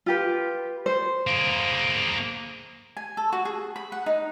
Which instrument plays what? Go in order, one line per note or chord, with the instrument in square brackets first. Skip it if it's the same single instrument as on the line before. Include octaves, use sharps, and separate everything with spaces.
[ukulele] F4 G4 B4
C5
[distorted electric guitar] A#3 G#4
[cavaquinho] G#5
A4
F#4
G#4
B5
F#5
D#4